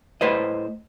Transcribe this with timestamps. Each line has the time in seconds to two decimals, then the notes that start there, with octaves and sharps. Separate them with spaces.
0.21 A2 B4 C5 D#5